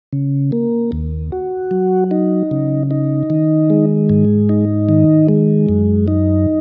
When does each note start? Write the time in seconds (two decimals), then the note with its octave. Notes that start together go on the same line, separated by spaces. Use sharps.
0.13 C#3
0.52 A#3
0.92 D#2
1.32 F#4
1.71 F#3
2.11 D#4
2.51 C#3
2.91 D#4
3.30 D#3
3.70 G#3
4.09 G#2
4.49 D#4
4.89 D#3
5.28 G#3
5.69 F#2
6.08 D#4